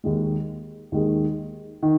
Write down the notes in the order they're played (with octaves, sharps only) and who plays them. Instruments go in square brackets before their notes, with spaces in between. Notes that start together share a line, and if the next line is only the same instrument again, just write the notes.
[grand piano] D#2 D#3 G#3
D#2 D#3 G#3
D#3